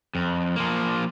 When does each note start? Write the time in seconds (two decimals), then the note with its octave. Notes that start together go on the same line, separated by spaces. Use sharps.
0.15 F2
0.56 F3 A#3